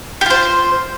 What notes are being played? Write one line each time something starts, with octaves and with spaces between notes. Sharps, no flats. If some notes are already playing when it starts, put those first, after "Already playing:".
F4 G4 C5